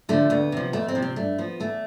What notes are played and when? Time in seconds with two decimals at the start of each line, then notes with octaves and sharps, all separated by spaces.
0.09 D3 F3 A3
0.30 D2 B3
0.52 C3 F3
0.73 F2 A3
0.88 C4
0.95 C3 F3
1.02 C4
1.16 G2 A3
1.38 F3 B3
1.60 E2 A3